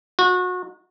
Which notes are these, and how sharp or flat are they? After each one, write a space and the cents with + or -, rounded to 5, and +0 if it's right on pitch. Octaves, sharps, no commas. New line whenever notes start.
F#4 -30